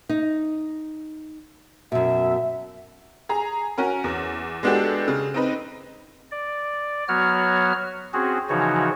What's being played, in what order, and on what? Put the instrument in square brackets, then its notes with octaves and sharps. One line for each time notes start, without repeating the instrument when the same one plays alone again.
[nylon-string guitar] D#4
[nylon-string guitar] F#2 B2 [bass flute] E5
[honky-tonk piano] G#4 A#5
C#4 F#4 A#4
E2
G#3 B3 D4 F#4 G4 A4
C#3
C4 D#4 B4
[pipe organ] D5
F#3 B3 F#4 C#5 F6
C4 C#4 F#4 G#4
C#3 E3 F3 D#4 F#4 C#5